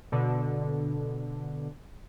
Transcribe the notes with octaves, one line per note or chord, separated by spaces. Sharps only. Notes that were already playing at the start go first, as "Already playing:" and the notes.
B2 D3